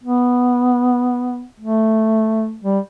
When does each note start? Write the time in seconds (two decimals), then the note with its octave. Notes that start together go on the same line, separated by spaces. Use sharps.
0.03 B3
1.60 A3
2.63 G3